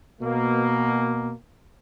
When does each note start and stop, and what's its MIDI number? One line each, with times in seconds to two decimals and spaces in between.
0.22 1.32 47
0.22 1.32 58